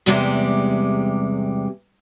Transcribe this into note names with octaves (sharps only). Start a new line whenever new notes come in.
E2 C3 G3 G#3 G4 E5